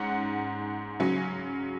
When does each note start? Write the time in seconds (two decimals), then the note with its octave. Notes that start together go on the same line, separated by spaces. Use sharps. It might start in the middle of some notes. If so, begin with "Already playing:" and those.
Already playing: G#2 C#4 F#5
1.00 C#3 F#3 C#4